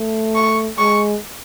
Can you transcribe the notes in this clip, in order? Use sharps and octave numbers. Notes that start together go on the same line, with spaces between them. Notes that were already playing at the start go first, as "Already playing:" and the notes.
Already playing: A3
C#6
G#3 C#6